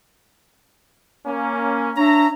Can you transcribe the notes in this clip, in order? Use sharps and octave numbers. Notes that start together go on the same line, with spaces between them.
A#3 C#4
D4 C#5 E5 A#5